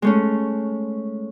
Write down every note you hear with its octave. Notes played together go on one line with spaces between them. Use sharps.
G#3 A3 C#4